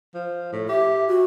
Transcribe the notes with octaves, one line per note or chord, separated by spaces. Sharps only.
F3
A2
G4 E5
F#4